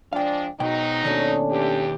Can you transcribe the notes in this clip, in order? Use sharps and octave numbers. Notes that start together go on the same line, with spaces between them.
F3 G#3 D4 F5 G5
G#2 B2 F#3 D#4 G5
D#2 B2 A3 C#4 D4 C#5
E2 G4